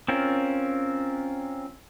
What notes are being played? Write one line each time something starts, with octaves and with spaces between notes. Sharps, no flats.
C4 C#4 F4 A#4